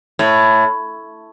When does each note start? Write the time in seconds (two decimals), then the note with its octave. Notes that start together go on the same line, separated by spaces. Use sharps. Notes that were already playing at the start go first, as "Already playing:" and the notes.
0.19 A2